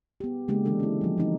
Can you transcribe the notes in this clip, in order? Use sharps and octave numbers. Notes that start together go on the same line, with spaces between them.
B3 G4
C#3 G#3 A#3 D4 G4
D3 E3 G#3 D4 A4
C#4 E4
F3 F#3
E3 C4 D#4